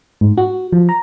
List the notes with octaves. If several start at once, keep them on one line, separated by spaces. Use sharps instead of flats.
G#2
F#4
F3
A#5